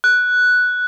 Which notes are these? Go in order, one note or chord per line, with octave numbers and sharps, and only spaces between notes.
F#6